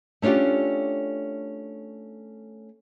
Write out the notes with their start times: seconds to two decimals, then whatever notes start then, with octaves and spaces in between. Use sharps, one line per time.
0.22 A3 C#4 D4 F4 G4